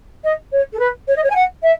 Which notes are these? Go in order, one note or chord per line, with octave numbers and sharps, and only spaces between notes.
D#5
C#5
A4
B4
C#5
D#5
C#5
G#5
F#5
E5